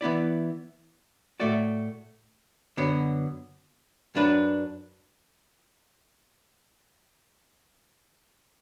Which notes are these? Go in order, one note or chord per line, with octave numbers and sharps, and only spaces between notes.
E3 B3 E4 D5
A2 A3 F#4 D5
F#2 D3 F#3 B3
F#2 F#3 D4 B4